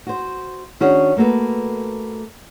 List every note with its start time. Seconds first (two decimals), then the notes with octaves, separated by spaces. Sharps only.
0.07 F#4 C5
0.80 D#3 C#4 D4 F#4 G#4 C#5
1.17 A3 A#3 F#4 A4 B4